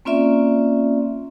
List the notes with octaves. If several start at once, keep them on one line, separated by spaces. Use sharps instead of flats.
A#3 C4 C#4 F4 D5 E5